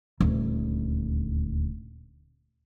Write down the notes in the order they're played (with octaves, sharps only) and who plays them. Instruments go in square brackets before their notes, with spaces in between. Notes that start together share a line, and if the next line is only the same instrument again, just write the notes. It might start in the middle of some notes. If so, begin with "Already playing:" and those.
[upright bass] D#1 D2